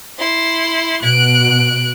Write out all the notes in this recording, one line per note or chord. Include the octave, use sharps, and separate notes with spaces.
E4 C6
B2 F#6 D7